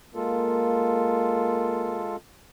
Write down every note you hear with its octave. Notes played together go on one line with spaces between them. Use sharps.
G#3 A#3 F4 A4